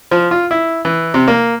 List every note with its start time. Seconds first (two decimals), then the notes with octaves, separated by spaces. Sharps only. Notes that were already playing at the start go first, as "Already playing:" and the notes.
0.11 F3
0.31 F4
0.51 E4
0.85 E3
1.14 C3
1.28 A#3